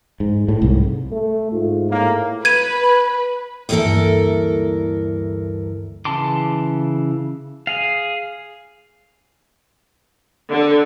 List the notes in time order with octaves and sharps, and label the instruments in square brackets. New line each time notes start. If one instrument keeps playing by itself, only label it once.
[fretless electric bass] G#2
A2
C2 G#2
[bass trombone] A3
[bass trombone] G#2 [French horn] F4
[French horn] A2 [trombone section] A#3
[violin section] B4 [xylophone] G#6 D#7
[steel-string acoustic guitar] D2 G2 E3 A#3 A4 A#4
[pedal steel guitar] C#3 E3 A5 C6 D6
G#4 F5
[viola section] D3